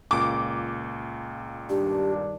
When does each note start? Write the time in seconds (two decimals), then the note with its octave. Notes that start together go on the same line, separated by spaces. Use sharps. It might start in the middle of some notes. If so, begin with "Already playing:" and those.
0.11 C#2 A#2 D6
1.70 G2 D#3 D4 G4